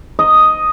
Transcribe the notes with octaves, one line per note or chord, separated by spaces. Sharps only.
D#5